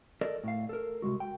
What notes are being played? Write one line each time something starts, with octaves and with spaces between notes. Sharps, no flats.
A4 A#4 D5 D#5
A2 F5
A4 A#4
C2 G2 G#3 F#4
G5